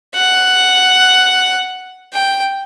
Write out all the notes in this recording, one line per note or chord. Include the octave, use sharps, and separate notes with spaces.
F#5
G5